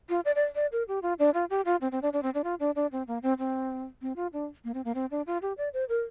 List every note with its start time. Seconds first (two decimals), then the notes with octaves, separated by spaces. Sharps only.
0.09 F4
0.25 D5
0.36 D5
0.55 D5
0.72 A#4
0.88 G4
1.02 F4
1.19 D4
1.34 F4
1.50 G4
1.65 F4
1.81 C4
1.92 C4
2.02 D4
2.13 D4
2.23 C4
2.34 D4
2.44 F4
2.60 D4
2.76 D4
2.92 C4
3.08 A#3
3.23 C4
3.39 C4
4.02 C4
4.16 F4
4.33 D4
4.64 A#3
4.74 C4
4.85 A#3
4.95 C4
5.11 D4
5.27 F4
5.42 G4
5.58 D5
5.74 C5
5.89 A#4